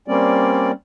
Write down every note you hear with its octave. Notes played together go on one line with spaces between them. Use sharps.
G3 A#3 C4 C#4 D5